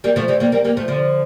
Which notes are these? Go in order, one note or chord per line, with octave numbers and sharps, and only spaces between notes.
G3 A#3
F3 A3
E3 G3
G3 A#3
G3 A#3
G3 A#3
F3 A3
D3 F3